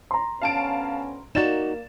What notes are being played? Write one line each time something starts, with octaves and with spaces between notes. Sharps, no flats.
A#5 C6
D2 B3 C#4 F5 A5 D7
A#3 D#4 F#4 D5 A6 E7